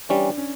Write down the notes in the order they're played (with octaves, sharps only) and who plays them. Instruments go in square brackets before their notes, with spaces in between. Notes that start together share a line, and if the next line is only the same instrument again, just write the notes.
[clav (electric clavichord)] E3 G3 C#4 [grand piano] D4
[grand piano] C#4